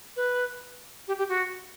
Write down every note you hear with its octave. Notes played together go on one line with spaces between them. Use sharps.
B4
G4
G4
F#4